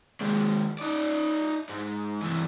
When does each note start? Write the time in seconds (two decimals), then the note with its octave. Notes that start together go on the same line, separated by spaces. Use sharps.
0.21 D#2 G#3
0.79 D#4 D5
1.69 G#2
2.22 G2 E3